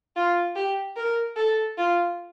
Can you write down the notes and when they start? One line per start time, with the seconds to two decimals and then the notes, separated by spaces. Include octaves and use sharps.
0.16 F4
0.56 G4
0.97 A#4
1.36 A4
1.78 F4